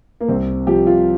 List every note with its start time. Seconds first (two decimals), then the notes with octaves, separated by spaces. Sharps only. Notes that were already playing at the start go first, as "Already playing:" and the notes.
0.21 A#3
0.29 C2 C4
0.67 F3 G4
0.87 F4